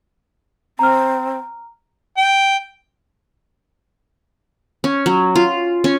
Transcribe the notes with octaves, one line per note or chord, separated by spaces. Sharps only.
C4 A#5 F6
G5
C#4
F#3
F4
C#4